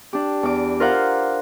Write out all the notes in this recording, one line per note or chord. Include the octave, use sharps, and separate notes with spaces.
D4 G4
E2 D6
F4 A#4 C5 F5 F#5